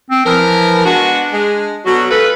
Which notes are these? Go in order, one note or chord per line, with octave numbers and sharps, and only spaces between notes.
C4
E3 F3 A#4
G#3 B3 D4 F#4
G#3
B2 D3 F#3 F#4
G#3 F4 A4 B4